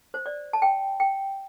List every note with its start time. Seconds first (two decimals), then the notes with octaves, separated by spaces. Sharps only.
0.14 C5
0.26 D5
0.53 A5
0.62 G5
1.00 G5